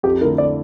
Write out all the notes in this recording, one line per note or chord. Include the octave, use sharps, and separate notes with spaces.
F2 G4
D3 A3 E4 A#4
D5